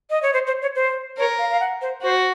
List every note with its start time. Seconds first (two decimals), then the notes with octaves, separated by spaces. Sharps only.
0.10 D#5
0.23 C#5
0.33 C5
0.47 C5
0.62 C#5
0.75 C5
1.18 A#4 C#5
1.39 F5
1.50 F5
1.60 F#5
1.82 C5
2.02 F#4 C5